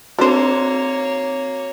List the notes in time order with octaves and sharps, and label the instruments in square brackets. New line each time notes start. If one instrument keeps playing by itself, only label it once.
[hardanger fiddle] A#3 C#5 [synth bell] C4 D#4 F#4 [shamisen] D4 C5